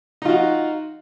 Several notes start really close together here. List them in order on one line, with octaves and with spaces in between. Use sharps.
D#4 F4 F#4